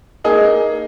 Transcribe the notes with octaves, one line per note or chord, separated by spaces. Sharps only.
A#3 D#4 G#4